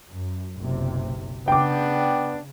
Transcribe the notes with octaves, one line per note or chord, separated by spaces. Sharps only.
F#2
F#1 B1 C3
C#3 B3 D4 G5 D6